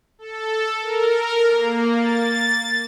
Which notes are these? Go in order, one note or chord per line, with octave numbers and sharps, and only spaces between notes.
A4
A#4
A#3
A6